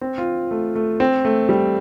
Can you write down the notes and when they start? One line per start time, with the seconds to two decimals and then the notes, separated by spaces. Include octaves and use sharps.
0.01 C4
0.18 F4
0.51 A3
0.75 A3
1.00 C4
1.25 A3
1.49 G3